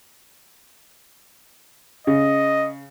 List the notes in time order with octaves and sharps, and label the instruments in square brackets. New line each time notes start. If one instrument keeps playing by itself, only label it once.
[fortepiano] C#3 [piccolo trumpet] D#5